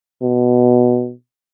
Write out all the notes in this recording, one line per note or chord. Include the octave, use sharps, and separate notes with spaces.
B2